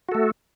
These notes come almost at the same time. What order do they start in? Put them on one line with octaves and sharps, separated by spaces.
F#4 A4 A3